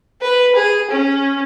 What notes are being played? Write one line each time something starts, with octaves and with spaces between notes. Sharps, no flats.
B4
G#4
C#4